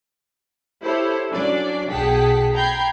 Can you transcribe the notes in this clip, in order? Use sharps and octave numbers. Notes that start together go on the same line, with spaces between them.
E4 G4 A4 C5 C#5
F#3 C#4 D4 D5
B1 G#4 F#5 G5 A5 B6
G5 A#5 B5 G6 G#6 C7